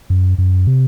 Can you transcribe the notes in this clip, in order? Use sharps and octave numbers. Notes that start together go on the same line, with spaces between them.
F#2
F#2
C3